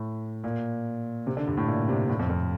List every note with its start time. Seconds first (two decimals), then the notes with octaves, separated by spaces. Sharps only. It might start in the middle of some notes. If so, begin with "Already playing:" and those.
Already playing: A2
0.44 A#2
1.27 C3
1.37 D3
1.47 G2
1.57 A2
1.67 A#2
1.89 C3
2.09 A2
2.19 F2
2.30 F2